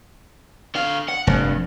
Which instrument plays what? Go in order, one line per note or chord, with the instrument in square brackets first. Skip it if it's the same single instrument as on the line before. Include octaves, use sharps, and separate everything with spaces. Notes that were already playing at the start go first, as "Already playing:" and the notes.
[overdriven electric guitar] D3 F5
F#5
[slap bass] F1 [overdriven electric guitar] G2